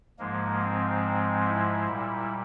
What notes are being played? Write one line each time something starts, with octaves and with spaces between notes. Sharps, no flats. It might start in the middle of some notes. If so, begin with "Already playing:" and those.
G#2 F3 G#3 A#3
C4
E4
A#2 G3